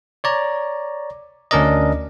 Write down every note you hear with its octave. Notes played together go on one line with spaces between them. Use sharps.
C#5 D5 A#5
D2 C#4 D4 A#4 D5 D#5